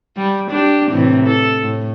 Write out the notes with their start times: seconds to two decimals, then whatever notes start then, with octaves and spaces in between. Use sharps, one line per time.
0.17 G3
0.51 D4 G4
0.91 A2 C3 E3
1.26 A4
1.61 A2